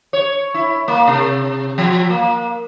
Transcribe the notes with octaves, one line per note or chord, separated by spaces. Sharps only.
C#5
E4
A#3
C3
F3
A#3